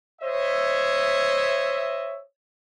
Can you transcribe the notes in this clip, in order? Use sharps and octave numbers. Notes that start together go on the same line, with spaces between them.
C5 C#5 D#5 E5